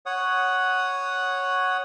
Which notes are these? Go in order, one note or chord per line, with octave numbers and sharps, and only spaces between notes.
C#5 F#5 D#6